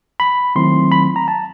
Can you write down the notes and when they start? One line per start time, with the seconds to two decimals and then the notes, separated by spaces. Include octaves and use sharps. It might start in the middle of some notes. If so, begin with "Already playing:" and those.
0.20 B5
0.56 D#3 F#3 A3 C4 E4 C6
0.92 B5
1.16 A#5
1.28 A5